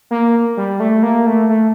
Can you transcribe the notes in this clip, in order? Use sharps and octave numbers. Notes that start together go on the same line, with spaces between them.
A#3
G3
A3
A#3
A3
A3